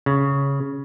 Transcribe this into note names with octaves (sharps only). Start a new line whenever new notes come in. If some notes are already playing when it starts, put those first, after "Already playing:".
C#3